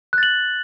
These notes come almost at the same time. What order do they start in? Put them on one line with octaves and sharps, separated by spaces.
F#6 A6 F#7